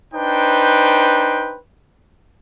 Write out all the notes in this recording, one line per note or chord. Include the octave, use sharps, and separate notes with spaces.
D4 D#4 B4 C5 G5